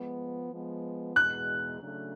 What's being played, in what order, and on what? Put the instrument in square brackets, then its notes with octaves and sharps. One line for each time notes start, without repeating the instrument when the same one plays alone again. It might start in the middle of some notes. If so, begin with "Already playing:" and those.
Already playing: [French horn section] F3 G#3 B3
F3 G#3 B3
[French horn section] E2 B2 G#3 B3 [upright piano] F#6
[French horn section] C#3 F#3 A3 D4